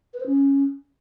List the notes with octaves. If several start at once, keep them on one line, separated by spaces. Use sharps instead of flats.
B4
C5
C#4